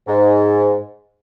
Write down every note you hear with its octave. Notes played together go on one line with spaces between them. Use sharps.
G#2